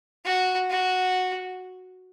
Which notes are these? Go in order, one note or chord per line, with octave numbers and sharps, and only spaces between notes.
F#4
F#4